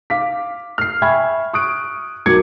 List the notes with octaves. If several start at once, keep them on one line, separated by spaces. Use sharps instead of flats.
F5 D6 B6
F6 C7
E5 G5 G#5 B5 C#6 G#6
C#6 D#6 F#6 D7
B1 F#4 A#4 D6 G#6 C#7